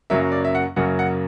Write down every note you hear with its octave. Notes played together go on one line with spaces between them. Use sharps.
F#2 C#3 F#3 A#3 E5
D5
E5
F#5
F#2 C#3 F#3 A#3 F#5
F#5